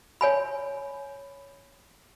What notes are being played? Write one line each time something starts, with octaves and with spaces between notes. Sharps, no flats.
C#5 G#5 B5